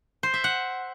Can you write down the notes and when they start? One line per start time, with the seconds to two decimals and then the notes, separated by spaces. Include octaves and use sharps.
0.23 C5
0.34 E5
0.44 F#5